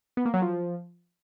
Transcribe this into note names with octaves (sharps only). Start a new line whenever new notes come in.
B3
A#3
F#3
F3